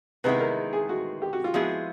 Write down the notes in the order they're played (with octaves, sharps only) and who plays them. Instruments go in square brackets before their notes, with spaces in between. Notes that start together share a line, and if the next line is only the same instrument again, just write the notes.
[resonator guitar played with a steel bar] C3 D#3 G#3 B3 E4 [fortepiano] B4
[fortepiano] A#4
G#4
F#4
G4
F#4
F4
[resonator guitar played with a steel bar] F3 G#3 B3 E4 G#4 [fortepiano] F#4